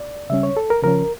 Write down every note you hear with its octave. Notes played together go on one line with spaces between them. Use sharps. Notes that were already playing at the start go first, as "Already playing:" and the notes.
Already playing: D5
C#3 G3 C#4 E5
C#5
A4
A#4
C#3 F3 C#4 A#4